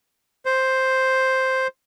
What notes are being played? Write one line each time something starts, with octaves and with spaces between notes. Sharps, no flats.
C5